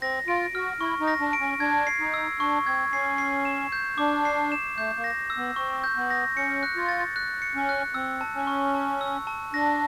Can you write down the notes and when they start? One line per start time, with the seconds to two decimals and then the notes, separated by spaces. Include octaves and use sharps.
0.01 C4 A#6
0.28 F4 D7
0.55 F#4 F6
0.80 E4 C#6
1.00 D#4
1.07 A#6
1.21 D4
1.33 D7
1.40 C#4
1.60 D4 G#6
1.87 C7
2.00 D#4
2.14 E6
2.40 D4 C#6
2.66 C4 G#6
2.93 C#4 C7
3.18 C7
3.45 E7
3.72 G6
3.98 D4 D6
4.25 C7
4.52 E7
4.77 A3 G6
4.97 A#3
5.04 A#6
5.30 E6
5.37 B3
5.56 C4 C#6
5.84 G6
5.97 B3
6.10 A#6
6.36 C#4 C#7
6.63 F#6
6.76 F4
6.89 A6
7.16 F#6
7.42 C#7
7.55 C#4
7.69 F#6
7.94 C4 E6
8.21 A5
8.34 C#4
8.47 C#6
8.74 A5
9.01 E6
9.27 A5
9.53 D4 A#6